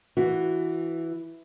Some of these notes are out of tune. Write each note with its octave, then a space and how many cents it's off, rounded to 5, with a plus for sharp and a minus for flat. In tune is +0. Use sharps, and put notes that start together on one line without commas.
E3 +5 F#4 -5